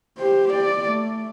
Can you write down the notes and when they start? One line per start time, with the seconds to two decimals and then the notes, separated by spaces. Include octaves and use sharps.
0.18 G4 C5
0.53 D5
0.85 A3